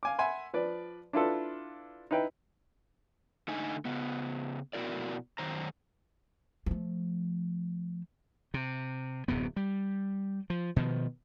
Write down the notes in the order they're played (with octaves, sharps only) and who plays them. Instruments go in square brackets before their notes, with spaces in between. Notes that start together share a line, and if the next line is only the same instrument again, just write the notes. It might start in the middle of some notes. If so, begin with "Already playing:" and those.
[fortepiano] F5 G#5 D6
E5 F#5 G#5 B5 C6
F3 B4 D5
D4 E4 F4 A4 B4
D#4 E4 B4 G5
[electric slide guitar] D3 A3 D#4 G#5
C#3 B3
F2 B2 E4 F#4 A#4 D5
F#2 D#3 C5 A#5
[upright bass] F3 A3
[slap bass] C3
D1 F#2 C3 B3
G3
F3
B2 D#3 F3